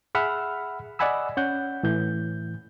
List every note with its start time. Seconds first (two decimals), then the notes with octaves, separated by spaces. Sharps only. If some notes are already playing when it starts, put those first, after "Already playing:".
0.15 G#4 E5 F#5 B5 E6 F6
0.99 D5 D#5 F#5 G#5 B5 E6
1.37 C#4 F#5 G6
1.83 A2 E3 G6